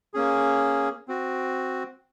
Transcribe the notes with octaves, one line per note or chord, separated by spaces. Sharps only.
A#3 C#4 G#4
C4 F#4